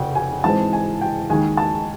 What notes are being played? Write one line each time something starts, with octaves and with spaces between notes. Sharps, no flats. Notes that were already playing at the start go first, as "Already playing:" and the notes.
Already playing: F1 F2 C#3 F#5 G5
G#5
G#2 E3 G#3 C4 A5
G#5
G5
D#2 D#3 G#3 G#5
A5